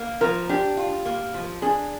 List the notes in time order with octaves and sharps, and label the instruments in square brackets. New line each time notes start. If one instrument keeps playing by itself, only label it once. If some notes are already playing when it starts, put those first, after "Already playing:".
Already playing: [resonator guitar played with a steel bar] A#3
[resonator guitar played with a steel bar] F3 [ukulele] A#4
[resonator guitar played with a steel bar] D4 [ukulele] G4
[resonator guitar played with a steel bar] F4
A#3
F3
[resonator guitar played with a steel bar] D4 [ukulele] G#4